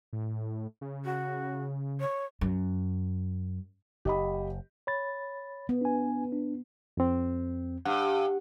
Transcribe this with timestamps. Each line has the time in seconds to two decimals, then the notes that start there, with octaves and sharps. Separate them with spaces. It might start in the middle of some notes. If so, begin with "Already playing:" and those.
0.13 A2
0.81 C#3
1.05 F#4
2.00 C#5
2.41 F#2
4.05 F#1 G4 D#5 B5
4.87 C#5 B5 A6
5.69 B3
5.81 D4 G#5
6.33 D4
6.97 F2 C4
7.85 G2 F#5